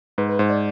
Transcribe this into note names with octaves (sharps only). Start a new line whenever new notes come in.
G#2 B4
B4
G#2 C5
D5